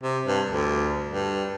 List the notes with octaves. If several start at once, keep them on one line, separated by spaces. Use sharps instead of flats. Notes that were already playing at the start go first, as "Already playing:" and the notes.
C3
G2
D2
G2